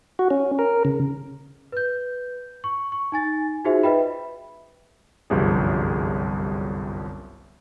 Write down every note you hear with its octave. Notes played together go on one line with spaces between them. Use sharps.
F#4
C#4
A#4
C#3
B4 G6
C#6
C#6
D#4 G#5 A6
D#4 F4 F#4 G#4 C5 E5
B4 D#5 E5 G5 B5
G1 C2 F#2 F3 G3 G#4